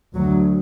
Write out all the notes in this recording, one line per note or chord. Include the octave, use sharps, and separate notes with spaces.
D2 F#3